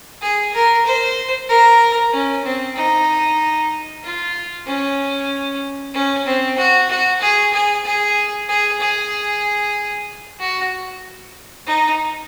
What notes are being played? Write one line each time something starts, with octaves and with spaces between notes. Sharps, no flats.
G#4
A#4
C5
A#4
C#4
C4
D#4
F4
C#4
C#4
C4
F#4
F#4
G#4
G#4
G#4
G#4
G#4
F#4
D#4